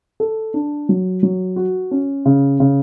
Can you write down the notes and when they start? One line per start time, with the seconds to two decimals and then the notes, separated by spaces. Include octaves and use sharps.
0.20 A4
0.54 D4
0.89 F#3
1.23 F#3
1.56 F#4
1.91 C#4
2.26 C#3
2.60 C#3